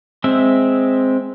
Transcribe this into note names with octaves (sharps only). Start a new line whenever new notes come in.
G#3 C4 E5